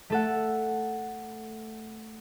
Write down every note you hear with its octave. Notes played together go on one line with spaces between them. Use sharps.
A3 A4 F#5